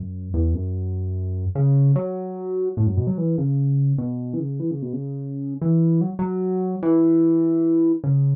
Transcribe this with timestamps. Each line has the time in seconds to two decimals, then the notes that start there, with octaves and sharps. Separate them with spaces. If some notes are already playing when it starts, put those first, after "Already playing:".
Already playing: F#2
0.34 E2
0.54 F#2
1.55 C#3
1.96 F#3
2.77 A2
2.87 F#2
2.97 B2
3.07 F#3
3.18 E3
3.38 C#3
3.98 B2
4.34 E3
4.40 C#3
4.60 E3
4.71 C#3
4.82 B2
4.93 C#3
5.62 E3
6.01 F#3
6.19 F#3
6.83 E3
8.04 C#3